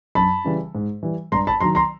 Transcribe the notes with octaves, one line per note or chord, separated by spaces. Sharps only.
F#2 A5 B5
C#3 E3 G3
G#2
E3 G3
G2 A#5 C6
A5 B5
D#3 F#3 A#5 C6
A#5 C6